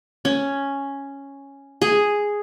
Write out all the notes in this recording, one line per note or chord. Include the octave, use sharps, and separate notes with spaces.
C#4
G#4